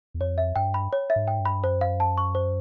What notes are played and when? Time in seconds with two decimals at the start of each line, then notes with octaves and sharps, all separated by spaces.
0.14 E2
0.20 F2 C#5
0.38 E5
0.56 G2 G5
0.74 B5
0.93 C#5
1.10 E5
1.16 G#2
1.28 G5
1.40 G2
1.45 B5
1.64 F#2 C5
1.81 F5
2.00 A5
2.18 C#6
2.35 C5